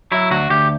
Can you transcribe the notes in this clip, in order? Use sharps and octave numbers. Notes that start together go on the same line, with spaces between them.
F#3 E4
D2 F#4
D2 G4